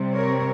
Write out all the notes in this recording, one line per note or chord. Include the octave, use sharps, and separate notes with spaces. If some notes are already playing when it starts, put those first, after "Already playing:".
Already playing: C3 G3 C4
A#4 C#5